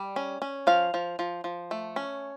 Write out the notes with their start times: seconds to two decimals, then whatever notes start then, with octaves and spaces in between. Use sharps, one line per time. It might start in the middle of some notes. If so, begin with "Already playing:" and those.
Already playing: G3
0.16 C#4
0.42 C#4
0.67 F3 F5
0.94 F3
1.19 F3
1.44 F3
1.71 A3
1.96 C#4